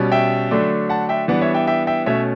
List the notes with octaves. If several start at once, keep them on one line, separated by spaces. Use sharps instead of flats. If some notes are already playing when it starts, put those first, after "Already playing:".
Already playing: B2 G3 C#4
E5 G5
D3 F#3 A3 D4
F#5 A5
E5 G5
E3 G3 B3 D4 D5 F#5
C#5 E5
E5 G5
E5 G5
E5 G5
B2 A3 C#4 C#5 E5